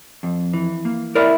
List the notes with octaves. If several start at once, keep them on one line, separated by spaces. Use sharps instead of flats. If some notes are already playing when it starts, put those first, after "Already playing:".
F2
E3
A#3
E4 A#4 D5